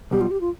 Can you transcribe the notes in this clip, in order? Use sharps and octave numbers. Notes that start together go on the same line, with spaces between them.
B1 B2 G3 G4
F4
G4
F4